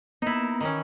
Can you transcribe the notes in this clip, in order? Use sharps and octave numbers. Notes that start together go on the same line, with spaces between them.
A#3 B3 D#4 E4 A#5
D#3 E3 C#4